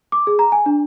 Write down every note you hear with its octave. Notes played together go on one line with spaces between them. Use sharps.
D6
G#4
A#5
G#5
D4